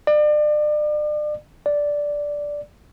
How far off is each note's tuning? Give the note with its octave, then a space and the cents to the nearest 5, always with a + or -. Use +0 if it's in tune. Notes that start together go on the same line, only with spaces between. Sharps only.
D5 +35
D5 -5